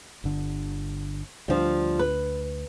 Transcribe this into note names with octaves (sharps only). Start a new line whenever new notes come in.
G1 D3
D2 F3 G3 D4
B4